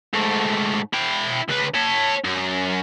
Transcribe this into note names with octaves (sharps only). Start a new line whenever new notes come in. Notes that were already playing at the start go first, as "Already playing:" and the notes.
G#2 A3
E4 G5
C#2 B4
C#5 A5
F#2